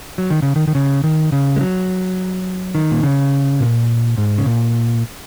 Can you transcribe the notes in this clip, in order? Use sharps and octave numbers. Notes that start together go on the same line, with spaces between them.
F#3
D#3
C#3
D#3
D#3
C#3
D#3
C#3
G#3
F#3
D#3
A#2
C#3
A#2
G#2
C#3
A#2